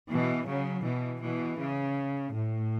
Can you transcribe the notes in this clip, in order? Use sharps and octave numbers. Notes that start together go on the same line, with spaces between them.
B2 E3
C#3 F#3
B2 E3
B2 E3
C#3
A2